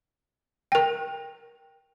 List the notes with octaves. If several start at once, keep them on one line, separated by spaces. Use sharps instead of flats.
A#4 G5